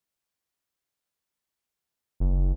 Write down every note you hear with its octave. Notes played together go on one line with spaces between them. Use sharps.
F#1